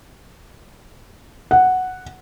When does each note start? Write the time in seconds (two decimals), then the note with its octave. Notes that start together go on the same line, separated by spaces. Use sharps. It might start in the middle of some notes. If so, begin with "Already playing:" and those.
1.51 F#5